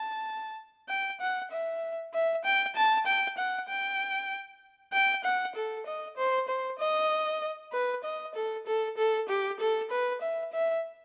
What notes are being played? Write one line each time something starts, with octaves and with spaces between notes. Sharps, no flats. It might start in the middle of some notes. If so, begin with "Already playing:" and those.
Already playing: A5
G5
F#5
E5
E5
G5
A5
G5
F#5
G5
G5
F#5
A4
D#5
C5
C5
D#5
B4
D#5
A4
A4
A4
G4
A4
B4
E5
E5